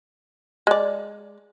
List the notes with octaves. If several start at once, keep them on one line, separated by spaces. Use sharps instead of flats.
G#3 D5